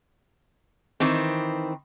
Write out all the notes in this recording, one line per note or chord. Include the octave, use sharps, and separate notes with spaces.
D#3 E3 C4